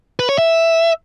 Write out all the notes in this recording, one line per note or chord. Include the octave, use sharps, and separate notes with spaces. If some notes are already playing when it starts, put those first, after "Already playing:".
B4
C#5
E5